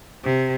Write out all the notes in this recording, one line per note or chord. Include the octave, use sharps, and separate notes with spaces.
C3